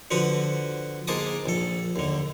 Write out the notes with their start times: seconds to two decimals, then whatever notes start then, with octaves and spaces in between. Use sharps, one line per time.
0.11 D3 F3 F#4 B4
1.07 G#2 G#3 A#3 A5 D6 D#6
1.46 A#1 A4
1.96 D#2 D3